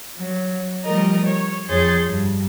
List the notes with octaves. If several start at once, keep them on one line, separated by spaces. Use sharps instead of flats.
F#3
F3 G3 A3 A#4 D#5
C#5
F2 G#4 C#5 C6 G6 A6
G2